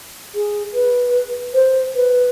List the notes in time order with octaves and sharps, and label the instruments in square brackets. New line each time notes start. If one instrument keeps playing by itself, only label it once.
[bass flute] G#4
B4
C5
B4